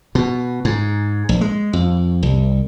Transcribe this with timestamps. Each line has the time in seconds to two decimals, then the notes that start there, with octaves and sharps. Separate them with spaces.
0.15 B2
0.65 G#2
1.29 A#1
1.41 G#3
1.73 F2
2.23 C2